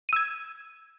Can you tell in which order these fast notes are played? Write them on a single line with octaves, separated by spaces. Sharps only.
D#7 E6 G#6